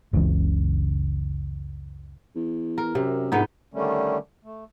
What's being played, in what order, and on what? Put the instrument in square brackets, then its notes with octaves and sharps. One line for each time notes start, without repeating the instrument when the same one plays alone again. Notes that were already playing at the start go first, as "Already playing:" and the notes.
[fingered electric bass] F#1 C#2 C#3 E3
[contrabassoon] E2
[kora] A#4
[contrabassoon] F#2 [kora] C3
[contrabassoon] A#1 [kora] G#2 B3 D#4
[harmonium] D3 D#3 G3 A3 C#4
A3